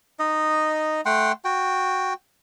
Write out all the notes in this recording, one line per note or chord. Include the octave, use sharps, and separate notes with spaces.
D#4 D#5
A3 F#5 G5 C6
F#4 G5